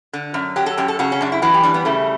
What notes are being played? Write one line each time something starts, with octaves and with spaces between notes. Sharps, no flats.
D3
F#2
F#3 G4
A4
F#2 G4
A4
C#3 F#4
C#4
F#2 D4
E4
E3 F#4
G4
G3 D4
B3
C#3 A3